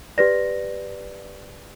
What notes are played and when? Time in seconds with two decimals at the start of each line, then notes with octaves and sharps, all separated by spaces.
0.18 G4 B4 D5 A#6